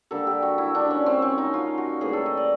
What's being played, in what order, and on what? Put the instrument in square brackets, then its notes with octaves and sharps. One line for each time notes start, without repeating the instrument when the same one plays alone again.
[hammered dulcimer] D3 G3 A#3 A4
G4
F#4
E4
D4
C#4
C4
C#4
D#4
F4
F#4
A2 E3 G3 A#3 G#4
A4
D#5
D5